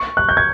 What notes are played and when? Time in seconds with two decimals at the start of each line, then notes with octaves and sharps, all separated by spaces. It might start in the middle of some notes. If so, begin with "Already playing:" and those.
Already playing: C#6
0.17 F#6
0.29 G6
0.37 G#6